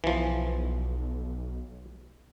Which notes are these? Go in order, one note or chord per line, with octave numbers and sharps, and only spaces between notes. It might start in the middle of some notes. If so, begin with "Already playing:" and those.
B1 E3 F3